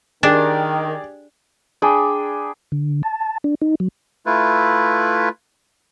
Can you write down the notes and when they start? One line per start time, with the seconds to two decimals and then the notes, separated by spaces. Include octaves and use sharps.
0.23 D#3 D4 G4 G#4 D5
1.82 D4 G#4 G5 B5
2.72 D3
3.03 A5
3.44 D4
3.61 D#4
3.80 F#3
4.26 A3 E4 F4 B4